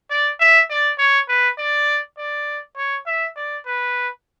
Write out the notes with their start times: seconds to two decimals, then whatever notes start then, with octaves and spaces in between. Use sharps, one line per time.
0.10 D5
0.40 E5
0.70 D5
0.98 C#5
1.28 B4
1.58 D5
2.18 D5
2.77 C#5
3.06 E5
3.36 D5
3.66 B4